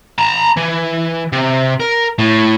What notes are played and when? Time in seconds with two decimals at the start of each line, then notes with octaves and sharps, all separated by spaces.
0.18 A5 A#5
0.57 E3
1.33 C3
1.80 A#4
2.19 A2